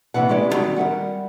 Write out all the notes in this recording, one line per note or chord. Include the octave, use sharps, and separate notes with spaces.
D#2 C3 E3 F#5
G#3 C#4 E4 G4 D5
D3 D#3 F#3 G3 C4 D#4
G3 A#4 E5 F#5